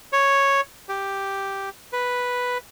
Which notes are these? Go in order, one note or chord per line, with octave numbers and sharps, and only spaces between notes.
C#5
G4
B4